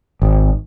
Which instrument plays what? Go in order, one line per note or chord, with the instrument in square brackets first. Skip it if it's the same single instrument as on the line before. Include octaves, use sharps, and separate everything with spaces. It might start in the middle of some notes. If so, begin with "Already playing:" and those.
[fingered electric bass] G#1